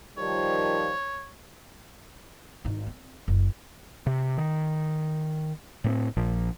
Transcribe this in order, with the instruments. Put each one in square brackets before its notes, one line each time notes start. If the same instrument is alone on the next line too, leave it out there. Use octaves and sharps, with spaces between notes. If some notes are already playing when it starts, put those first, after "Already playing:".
[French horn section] D#3 F3 G3 [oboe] C#5
[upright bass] G#1 D#4
C4
F#1
[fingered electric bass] C3
D#3
A2 B3 C4
A#1 A#2 F3